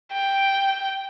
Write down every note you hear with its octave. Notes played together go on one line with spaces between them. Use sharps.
G5